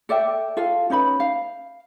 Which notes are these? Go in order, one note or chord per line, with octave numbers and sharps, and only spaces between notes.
A4 D5 E5 G5
F4 A4 F5
C#4 D#4 B4 B5
F5